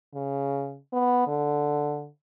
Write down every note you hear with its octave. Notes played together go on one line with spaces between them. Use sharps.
C#3
B3
D3